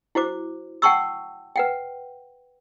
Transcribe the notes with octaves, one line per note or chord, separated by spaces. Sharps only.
E4 F#4 C5 D6
F#5 G5 A5 C6 C#6 E6
B4 F#5 G5